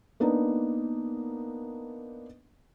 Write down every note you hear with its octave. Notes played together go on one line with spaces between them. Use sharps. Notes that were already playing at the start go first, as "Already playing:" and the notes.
A#3 B3 D4 D#4